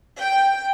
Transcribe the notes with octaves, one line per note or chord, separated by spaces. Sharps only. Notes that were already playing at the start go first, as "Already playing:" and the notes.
G5